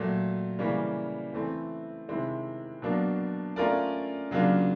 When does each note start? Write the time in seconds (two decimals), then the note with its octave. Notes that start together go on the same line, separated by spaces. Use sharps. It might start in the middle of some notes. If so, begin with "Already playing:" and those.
Already playing: A#2 F#3 A3
0.59 C#3 E3 G3 A#3 C#4
1.33 E3 A3 C4
2.08 C3 D#3 G#3 C4 E4
2.82 B2 F#3 A#3 D4
3.56 A3 C#4 F4 A#4 D5
4.31 C#3 F#3 A#3 D4 F4